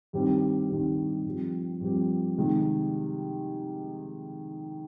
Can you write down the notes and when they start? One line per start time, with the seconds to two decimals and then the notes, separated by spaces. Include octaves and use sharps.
0.13 G2 D#3 G3 C4 G4
0.69 G2 D#3 G3 C4 G4
1.25 G2 F3 C4 G4
1.81 G2 F3 C4 G4
2.38 C3 D#3 G#3